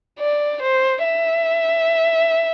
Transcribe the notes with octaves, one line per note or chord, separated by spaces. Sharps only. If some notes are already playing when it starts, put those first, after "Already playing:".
D5
C5
E5